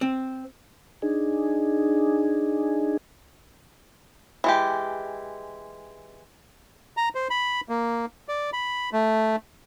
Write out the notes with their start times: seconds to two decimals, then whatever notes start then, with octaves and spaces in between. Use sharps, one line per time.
0.01 C4
1.02 D4 D#4 G#4
4.44 E3 G#3 G4
6.97 A#5
7.15 C5
7.30 B5
7.69 A#3
8.28 D5
8.53 B5
8.93 A3